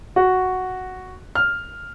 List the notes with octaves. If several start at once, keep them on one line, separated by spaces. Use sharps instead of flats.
F#4
F6